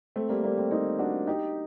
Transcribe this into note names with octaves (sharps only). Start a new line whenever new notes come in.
A3 C4
G3 A#3
G3 A#3
A3 C4
C4 D#4
D4 F#4
D#4 G4